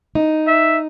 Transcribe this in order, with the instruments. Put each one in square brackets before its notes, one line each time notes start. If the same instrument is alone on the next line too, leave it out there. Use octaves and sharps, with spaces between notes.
[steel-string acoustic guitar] D#4
[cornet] E5